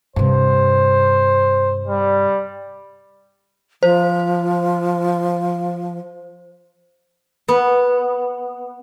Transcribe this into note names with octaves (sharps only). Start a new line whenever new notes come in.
G2 C3 C5
G3
F3 C5
B3